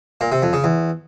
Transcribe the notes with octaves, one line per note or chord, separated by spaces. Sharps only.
A#2
C3
F2
C#3
E2